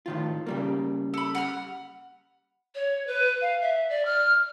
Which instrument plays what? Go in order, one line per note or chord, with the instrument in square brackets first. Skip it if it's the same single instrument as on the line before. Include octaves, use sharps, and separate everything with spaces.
[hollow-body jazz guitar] A2 D#3 F4
C#3 G3 A#3
[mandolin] A4 B5
F#5 B5 F6
[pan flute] C#5
B4
F5
E5
D5
F6